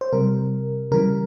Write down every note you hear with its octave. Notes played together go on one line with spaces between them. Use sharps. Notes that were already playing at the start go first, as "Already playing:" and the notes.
C5
C3 G3 A#4
C#3 E3 G3 A#4